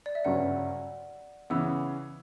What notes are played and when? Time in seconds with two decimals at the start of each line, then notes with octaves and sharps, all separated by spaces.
0.06 D5
0.15 E5
0.25 G1 F#2 C#3 F#3 F#5
1.50 C#3 E3 B3 E6